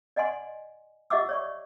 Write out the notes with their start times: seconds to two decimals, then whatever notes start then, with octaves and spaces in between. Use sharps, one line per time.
0.16 D5 D#5 F#5 G#5 C6
1.10 G4 D#5 E5 F#5 D6 E6
1.29 C#5 D5 C#6